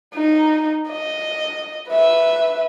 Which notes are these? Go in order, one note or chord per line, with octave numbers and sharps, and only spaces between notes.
D#4
D#5
B4 E5